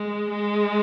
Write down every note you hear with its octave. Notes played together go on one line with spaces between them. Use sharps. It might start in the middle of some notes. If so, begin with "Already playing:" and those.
Already playing: G#3
G#3